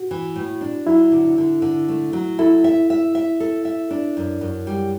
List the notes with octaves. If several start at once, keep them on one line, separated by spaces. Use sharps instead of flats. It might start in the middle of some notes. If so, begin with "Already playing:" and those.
Already playing: F#4
E3
A2
D4
F#3 E4
D3
D3
D3
A3
F#3
E4 A4
E5
E5
E5
A4
E5
D4
F#2
F#2
G3